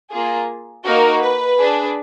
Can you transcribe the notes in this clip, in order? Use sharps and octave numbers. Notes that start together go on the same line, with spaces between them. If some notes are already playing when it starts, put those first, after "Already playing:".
A#3 F4 G#4
A#3 D#4 F#4 A#4
B4
D4 G#4